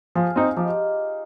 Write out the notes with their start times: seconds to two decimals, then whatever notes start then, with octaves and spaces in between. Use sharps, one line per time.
0.15 F3 F4 G#4
0.36 C4 D#4
0.56 F3 D#4 G4